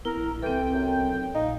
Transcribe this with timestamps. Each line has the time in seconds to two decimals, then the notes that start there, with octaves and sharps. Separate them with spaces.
0.05 B3 E4 A#4
0.17 A#1
0.42 C2 E3 C4 A4 G5
0.72 F#2
0.99 B1
1.35 A#1 D#4 F5